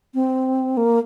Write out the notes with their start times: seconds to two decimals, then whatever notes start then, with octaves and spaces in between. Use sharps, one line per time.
0.14 C4
0.77 A#3